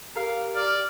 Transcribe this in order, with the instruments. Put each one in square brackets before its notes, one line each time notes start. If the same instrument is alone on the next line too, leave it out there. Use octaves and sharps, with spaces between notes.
[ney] G4 [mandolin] A#4 F5
[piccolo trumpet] D5 [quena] F6